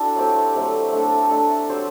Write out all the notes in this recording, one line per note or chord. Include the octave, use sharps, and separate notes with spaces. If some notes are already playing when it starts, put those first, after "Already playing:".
Already playing: D4 E4 F#4 A4 D5
F#3 A3 C4 G4
F#3 A3 C4 G4
A3 D4 A4
A3 D4 A4
F#3 C4 G4 C5